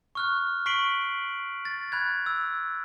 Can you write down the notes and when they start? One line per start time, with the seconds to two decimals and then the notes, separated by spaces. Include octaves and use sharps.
0.15 C#6 F6 F#6
0.66 C#6 B6 C7 D7 F#7
1.65 A6
1.92 B5 F#6 G#6
2.26 E6